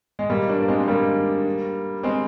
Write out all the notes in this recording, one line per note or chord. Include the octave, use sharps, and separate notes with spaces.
G#3
G3 A#3
A#3 D4
A#3
G#3 C4
G#3
G3 A#3
G#3 C4